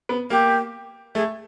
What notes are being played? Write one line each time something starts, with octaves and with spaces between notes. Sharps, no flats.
B3
A#3 G4
A3 G#4